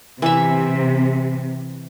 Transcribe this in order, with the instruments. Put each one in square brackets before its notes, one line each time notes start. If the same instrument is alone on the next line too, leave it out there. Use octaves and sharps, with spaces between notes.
[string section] C3 [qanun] E3 E5